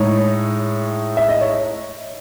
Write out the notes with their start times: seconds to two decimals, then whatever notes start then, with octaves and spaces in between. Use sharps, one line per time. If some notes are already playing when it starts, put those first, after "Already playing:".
Already playing: A2 G#3 D#4 C#5
1.17 E5
1.29 D#5
1.41 C#5